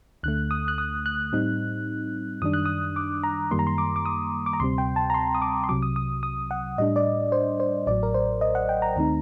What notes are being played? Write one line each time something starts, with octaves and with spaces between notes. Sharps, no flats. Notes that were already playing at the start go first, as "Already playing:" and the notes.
D2 D3 A3 F#6
D#6
F#6
D#6
F#6
A2 G3 C4 D#4
F#2 D#3 G3 D4 D#6
F#6
D#6
D6
A#5
F#2 D#3 G3 A#3 C6
A#5
C6
D6
D6
D#6
D6
A#5
D2 C3 G3 C4 C6
G5
A5
A#5
C6
D#6
D6
C6
C2 C3 F#3 D6
D#6
D#6
D#6
F#5
A2 G3 D4 D#5
D5
C5
C5
A1 A2 F#3 D5
A#4
C5
D#5
F#5
G5
A#5
D#2 D#3 A3 C4 D#4